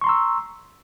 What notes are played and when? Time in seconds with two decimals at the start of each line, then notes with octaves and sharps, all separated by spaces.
0.01 C#6
0.04 C6
0.07 A#5
0.09 E6